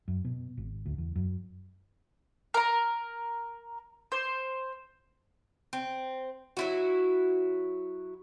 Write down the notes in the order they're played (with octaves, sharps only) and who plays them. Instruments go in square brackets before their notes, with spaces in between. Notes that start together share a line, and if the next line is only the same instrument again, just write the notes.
[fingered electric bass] F#2
B2
G#1
D2
E2
F#2
[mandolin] A#4 A#5
C5
[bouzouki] C4
F#3 E4 F#4